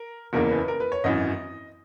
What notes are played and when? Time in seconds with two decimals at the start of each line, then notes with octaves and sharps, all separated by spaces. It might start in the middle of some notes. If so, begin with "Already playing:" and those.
Already playing: A#4
0.33 F#1 E2 C#3 E3 A#3 A#4
0.51 B4
0.68 A#4
0.80 B4
0.92 C#5
1.04 G#1 F#2 E3 D#5